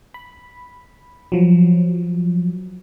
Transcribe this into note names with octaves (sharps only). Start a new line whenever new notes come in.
B5
F3 F#3